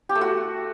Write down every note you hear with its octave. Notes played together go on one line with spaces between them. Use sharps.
G4
A3
F#4